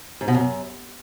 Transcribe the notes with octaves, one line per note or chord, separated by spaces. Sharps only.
G#2
B2
F#2